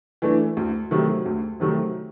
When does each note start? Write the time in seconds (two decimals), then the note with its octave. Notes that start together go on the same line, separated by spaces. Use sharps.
0.22 E3 A3 D4
0.57 D2
0.91 C3 D#3 F#3 A3
1.26 D2
1.60 C3 D#3 F#3 A3